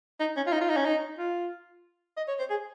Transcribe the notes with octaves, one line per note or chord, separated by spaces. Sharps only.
D#4
C#4
F4
D#4
F4
D#4
C#4
D#4
F4
D#5
C#5
C5
G#4